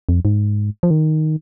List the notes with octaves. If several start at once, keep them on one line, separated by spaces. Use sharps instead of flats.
F2
G#2
F3
D#3